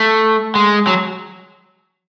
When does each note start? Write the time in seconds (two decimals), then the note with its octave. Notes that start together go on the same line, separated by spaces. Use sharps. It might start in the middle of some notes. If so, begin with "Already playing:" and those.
Already playing: A3
0.55 G#3
0.87 F#3